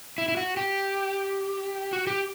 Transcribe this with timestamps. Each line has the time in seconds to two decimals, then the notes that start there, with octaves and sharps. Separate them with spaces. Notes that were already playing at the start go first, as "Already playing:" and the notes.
0.18 E4
0.28 E4
0.37 F#4
0.57 G4
1.93 F#4
2.07 G4